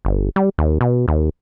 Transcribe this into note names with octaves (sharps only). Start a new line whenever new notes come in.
G1
G3
D#2
B2
D#2